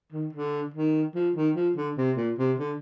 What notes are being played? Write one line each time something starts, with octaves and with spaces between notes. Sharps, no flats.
D#3
D3
D#3
F3
D#3
F3
D3
C3
A#2
C3
D3